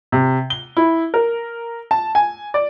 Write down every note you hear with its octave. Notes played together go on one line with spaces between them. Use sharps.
C3
G7
E4
A#4
A5
G#5
D5